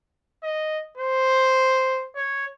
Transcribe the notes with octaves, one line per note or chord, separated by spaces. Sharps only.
D#5
C5
C#5